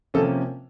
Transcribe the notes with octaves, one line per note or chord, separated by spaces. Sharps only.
C3 F3 A#3 C#4 A4